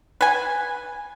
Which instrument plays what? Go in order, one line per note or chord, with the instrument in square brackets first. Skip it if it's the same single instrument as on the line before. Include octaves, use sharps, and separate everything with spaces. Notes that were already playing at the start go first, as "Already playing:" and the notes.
[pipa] B4 G#5